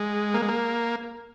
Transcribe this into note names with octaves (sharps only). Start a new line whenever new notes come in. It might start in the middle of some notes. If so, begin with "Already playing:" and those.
Already playing: G#3
A#3
G#3
A#3